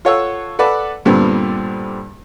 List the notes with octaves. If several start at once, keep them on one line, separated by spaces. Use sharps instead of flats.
F4 A4 C#5 F#5 E6
A4 B4 D5 F#5 A5
G2 A#2 D3 G3 B3 C4